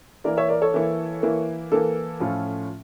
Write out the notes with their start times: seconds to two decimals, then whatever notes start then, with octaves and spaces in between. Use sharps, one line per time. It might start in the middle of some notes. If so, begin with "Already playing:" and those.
0.24 E3 A#3 E4 A#4 D5
0.37 C#5 E5
0.49 A#4 D5
0.62 A4 C#5
0.74 E3 A#3 E4
1.23 E3 A#3 E4
1.71 E3 A#3 E4 A4
2.20 A2 F3 C#4 F4